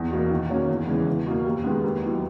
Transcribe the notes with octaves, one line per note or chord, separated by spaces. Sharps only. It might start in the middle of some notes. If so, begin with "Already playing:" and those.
Already playing: E2
B2 A#3
D#3
A#3 C#4 F#4
E2
C#3 E3 G#3 B3
E2
B2 A#3
D#2
D#3 G#3 B3
D#2
D#3 F#3 B3 E4